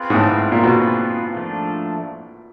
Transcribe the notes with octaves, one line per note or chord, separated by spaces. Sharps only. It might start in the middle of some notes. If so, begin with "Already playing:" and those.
Already playing: C4 F4 G#4 B4
G#2
A2
A#2
B2 C4 F4 G#4 B4
F3 A3 D4